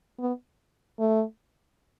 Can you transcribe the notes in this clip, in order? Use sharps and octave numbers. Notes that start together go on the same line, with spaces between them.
B3
A3